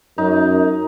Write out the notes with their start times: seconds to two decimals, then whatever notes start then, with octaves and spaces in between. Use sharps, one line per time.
0.18 F#2 D#4